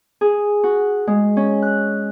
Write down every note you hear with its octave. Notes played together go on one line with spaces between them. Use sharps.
G#4
F#4
G#3
C#4
F#6